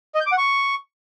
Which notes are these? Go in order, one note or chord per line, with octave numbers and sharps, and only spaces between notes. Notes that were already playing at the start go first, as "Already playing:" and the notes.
D#5
G6
D6
F#5
C#6